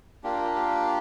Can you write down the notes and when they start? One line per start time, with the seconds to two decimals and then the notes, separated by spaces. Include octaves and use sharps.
0.24 A#3 D4 F4 G4
0.55 G4